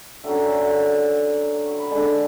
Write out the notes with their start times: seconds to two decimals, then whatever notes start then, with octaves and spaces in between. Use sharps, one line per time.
0.24 D3 F#3 C#4 E5
1.66 C#6
1.79 B5
1.91 D3 G#3 D4 A5